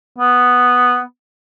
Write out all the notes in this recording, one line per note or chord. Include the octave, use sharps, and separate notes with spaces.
B3